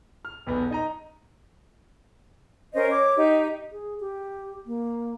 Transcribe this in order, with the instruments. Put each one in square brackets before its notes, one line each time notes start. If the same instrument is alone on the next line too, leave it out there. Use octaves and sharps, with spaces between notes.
[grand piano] F6
B1 E2 B3
D#4 D#5 A#5
[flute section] C#4 A#4 C5 D#5
C#5 D6
D#4 G4
[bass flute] G#4
G4
A#3